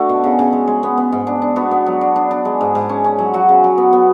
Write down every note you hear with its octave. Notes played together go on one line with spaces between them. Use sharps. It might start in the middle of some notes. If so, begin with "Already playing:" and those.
Already playing: A3 D4 F#4
B2
C#3
C#3
G#3
G#3
B3
B3
G#2
D4
D4
B3 F#4
B3
F#3
D4
D4
D4
G#3
G#2
G#2
C#4
C#4
F#3
F#3 F#4
C#3
F#3
B3
B3